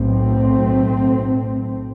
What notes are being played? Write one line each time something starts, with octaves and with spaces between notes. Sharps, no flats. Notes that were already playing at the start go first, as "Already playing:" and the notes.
Already playing: B1 A2 A3 C4